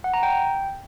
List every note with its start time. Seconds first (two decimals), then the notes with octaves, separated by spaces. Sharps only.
0.04 F#5
0.14 A#5
0.23 G5